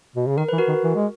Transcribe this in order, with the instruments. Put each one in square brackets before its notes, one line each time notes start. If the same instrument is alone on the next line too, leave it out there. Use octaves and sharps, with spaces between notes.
[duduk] B2
C#3
[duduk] D#3 [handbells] A#4
[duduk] E3 [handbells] B4
[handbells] F#4 A#4
[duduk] D#3
E3
G#3